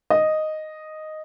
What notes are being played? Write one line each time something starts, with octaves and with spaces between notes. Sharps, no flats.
D#5